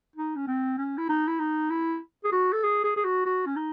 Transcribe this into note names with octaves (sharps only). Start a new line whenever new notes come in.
D#4
C#4
C4
C#4
E4
D#4
E4
D#4
E4
G#4
F#4
A4
G#4
G#4
G#4
F#4
F#4
C#4
D#4